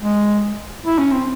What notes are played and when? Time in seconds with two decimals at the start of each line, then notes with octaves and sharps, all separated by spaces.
0.02 G#3
0.86 E4
0.99 C#4
1.11 C4